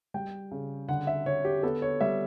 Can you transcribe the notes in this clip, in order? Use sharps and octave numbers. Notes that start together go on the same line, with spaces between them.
G3 G5
C#3
D3 F#5
E5
D3 C#5
G4
B3 A4
C#5
G3 E5